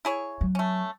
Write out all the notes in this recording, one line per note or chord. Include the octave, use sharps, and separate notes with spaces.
E4 G#4 C#5
F#3
A3 C#4